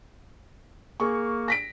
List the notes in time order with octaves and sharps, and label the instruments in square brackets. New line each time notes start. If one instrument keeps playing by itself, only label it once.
[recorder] A#3 [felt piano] G#4 C#6
[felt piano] A#6 B6 D7